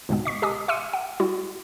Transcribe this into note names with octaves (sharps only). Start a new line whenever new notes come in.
C#2 G#2 B2 G#3 B3
D#5 C#6 B6
G4 D#5 G#5 D6 D#6
E5 C6 D6 E6 C#7 D#7
F#5
G3 E4 F#4